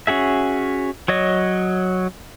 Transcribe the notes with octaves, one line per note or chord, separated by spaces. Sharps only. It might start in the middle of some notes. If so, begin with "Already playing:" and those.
C#4 F#4 G#4 E5
F#3 C#5 D#5